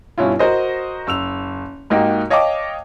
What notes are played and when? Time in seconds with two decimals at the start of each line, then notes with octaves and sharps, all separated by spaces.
0.18 G2 B2 C#4 E4 F4
0.39 F#4 A#4 C5 D#5
1.07 F#1 E6 F7
1.90 G#2 A#3 D#4 F#4 G4
2.30 C#5 D#5 F5 G5 A5 D6